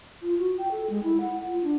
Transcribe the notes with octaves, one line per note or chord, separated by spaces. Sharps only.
F4
F#4
G5
A4
G#3
E4
F#5
F4
D4